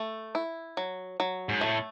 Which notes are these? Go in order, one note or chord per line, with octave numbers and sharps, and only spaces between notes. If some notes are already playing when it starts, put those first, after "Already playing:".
Already playing: A3
E4
F#3
F#3
G#2
A2 A3